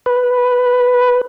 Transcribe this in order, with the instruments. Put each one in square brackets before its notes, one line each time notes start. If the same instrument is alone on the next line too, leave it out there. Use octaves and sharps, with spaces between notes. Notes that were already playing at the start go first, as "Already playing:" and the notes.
[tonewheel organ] B4